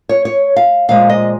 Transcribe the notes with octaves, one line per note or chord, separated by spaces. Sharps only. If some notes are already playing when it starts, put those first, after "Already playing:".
C#5
C#5
F5
A#2 F3 G#3 F5
D#5